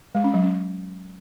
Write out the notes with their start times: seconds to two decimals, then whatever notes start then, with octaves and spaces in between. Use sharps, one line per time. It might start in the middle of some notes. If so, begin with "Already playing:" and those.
0.15 G#3
0.24 C#4
0.34 F#3
0.43 C#4